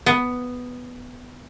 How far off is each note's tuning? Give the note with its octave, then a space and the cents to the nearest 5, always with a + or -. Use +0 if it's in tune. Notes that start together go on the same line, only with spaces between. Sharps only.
B3 +5